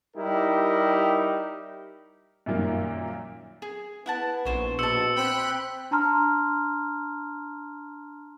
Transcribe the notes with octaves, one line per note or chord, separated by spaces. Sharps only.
G3 D#4 E4 G4 A#4
F#2 A#2 D#3 G3 A#3
G#4
B3 E4 F#5 A5
A#1 E4 C5 C#5
B2 C5 A5 E6 C#7
C4 G5 B5 F#6
D4 A5 A#5 C6 F6